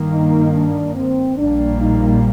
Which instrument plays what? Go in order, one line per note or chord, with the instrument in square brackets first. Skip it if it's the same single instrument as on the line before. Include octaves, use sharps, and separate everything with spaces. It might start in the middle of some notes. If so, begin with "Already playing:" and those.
Already playing: [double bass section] G2 D#3 A#3
[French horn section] D#4
D4
C4
[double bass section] A#1 A#2 G3 A#3 [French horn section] D4
[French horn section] D#4